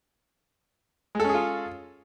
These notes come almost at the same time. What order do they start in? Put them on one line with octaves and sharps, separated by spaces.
G#3 A4 C#4 G#4 F4